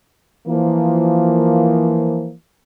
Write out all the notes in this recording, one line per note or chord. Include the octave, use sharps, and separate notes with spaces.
E3 F3 A#3